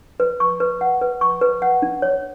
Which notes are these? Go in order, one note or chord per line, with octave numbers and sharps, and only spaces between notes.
B4
C#6
B4
F#5
B4
C#6
B4
F#5
D4
C#5